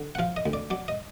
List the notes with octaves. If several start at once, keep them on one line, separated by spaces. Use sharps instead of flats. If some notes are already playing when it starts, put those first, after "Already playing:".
Already playing: D3
F#5
F3 F5
D#5
D2
D5
F#3 D5
D#5